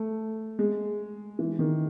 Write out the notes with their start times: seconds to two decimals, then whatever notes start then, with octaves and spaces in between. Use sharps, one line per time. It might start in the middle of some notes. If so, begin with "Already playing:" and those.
Already playing: A3
0.59 G#3
1.39 E3
1.59 D#3